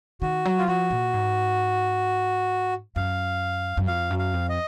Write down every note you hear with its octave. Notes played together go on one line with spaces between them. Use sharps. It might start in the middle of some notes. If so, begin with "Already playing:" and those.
D#3 F#4
F#3
F4
F3 F#4
A#2
G#2
F#2 F5
F#2
F2 F5
F#2
F5
F2
D#5